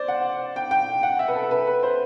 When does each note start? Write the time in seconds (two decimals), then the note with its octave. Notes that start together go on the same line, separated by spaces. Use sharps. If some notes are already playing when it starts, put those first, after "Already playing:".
Already playing: C5 D5
0.08 F#5
0.56 G5
0.71 G5
1.03 F#5
1.19 E5
1.28 B4
1.35 A4
1.51 B4
1.67 B4
1.83 C5